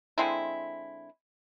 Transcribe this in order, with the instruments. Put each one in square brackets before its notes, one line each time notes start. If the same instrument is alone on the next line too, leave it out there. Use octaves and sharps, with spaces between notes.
[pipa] D3 G#3 C4 E4